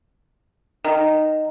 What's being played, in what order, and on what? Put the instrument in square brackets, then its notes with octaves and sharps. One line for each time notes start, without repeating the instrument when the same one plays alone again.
[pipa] D#3